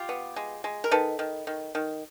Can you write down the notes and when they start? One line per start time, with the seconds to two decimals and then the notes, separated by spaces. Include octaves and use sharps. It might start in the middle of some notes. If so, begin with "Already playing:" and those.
Already playing: F4 G4
0.09 B3
0.36 G#3
0.64 G#3
0.84 A#4
0.91 D#3 A4 B4
1.19 D#3
1.47 D#3
1.75 D#3